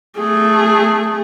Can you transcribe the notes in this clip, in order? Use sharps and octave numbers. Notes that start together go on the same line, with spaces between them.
A3 G#4